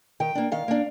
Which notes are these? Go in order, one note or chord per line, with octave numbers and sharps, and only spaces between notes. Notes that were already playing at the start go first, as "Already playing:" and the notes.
D#3 G5
A#3 D4
D#3 F5
A#3 D4